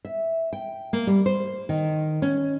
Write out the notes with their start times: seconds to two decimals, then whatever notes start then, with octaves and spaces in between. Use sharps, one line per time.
0.05 E5
0.53 G5
0.93 A#3
1.07 G3
1.26 C5
1.69 D#3
2.22 C#4